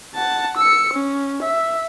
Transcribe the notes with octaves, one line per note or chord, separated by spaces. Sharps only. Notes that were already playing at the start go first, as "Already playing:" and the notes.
F#5 A5
E6 C#7
C#4
E5